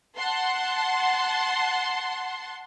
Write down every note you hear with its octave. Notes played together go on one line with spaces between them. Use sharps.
F#5 A5 C6